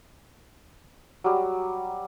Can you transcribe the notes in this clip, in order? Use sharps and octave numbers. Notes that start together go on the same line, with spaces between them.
F#3 G3